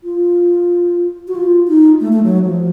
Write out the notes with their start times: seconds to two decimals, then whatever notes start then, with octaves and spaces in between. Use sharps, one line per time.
0.04 F4
1.28 F#4
1.35 F4
1.68 D#4
2.00 A3
2.12 A3
2.23 F#3
2.45 F3